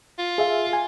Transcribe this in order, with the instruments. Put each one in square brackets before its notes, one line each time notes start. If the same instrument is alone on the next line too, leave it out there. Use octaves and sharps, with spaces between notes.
[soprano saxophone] F4
[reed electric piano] G#4 E5 F5
G#5